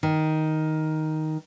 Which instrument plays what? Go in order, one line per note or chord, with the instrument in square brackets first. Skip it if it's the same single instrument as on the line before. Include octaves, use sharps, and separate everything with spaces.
[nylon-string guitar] D#3